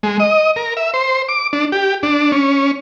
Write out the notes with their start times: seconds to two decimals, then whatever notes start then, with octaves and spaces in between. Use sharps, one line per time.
0.03 G#3
0.20 D#5
0.56 A#4
0.77 E5
0.94 C5
1.29 D6
1.53 D4
1.72 G4
2.03 D4
2.32 C#4